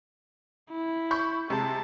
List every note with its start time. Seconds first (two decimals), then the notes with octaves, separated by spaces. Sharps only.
0.70 E4
1.11 B5 C#6 G6
1.50 C3 G#3 A5